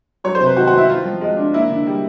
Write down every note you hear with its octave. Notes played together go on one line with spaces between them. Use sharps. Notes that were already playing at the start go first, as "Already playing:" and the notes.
F#3 C#5
C5
C3
B4
D#3 F#4
F#4
B3
E4
B3 F4
F3
G#3
D4
A#3 E4
D3
G3